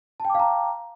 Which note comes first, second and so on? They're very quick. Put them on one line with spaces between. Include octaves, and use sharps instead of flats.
A5 G5 D6 F5 A#5